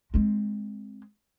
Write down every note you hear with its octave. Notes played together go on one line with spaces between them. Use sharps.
G#3 C4